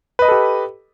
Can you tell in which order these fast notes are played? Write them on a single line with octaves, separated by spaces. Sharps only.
B4 D#5 B5 A4 G4